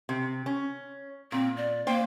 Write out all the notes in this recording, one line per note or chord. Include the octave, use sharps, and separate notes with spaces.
C3
C#4
A#2 C4
D5
A#3 C5 G5